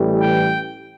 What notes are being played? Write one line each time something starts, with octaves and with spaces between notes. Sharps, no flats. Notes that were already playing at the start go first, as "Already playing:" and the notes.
Already playing: A1 A2 E3 G3
G5